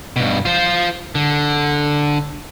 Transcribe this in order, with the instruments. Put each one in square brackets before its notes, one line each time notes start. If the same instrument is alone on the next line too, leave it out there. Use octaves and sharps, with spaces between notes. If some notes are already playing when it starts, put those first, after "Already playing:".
[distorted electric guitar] G2 B2
F4 C5
D3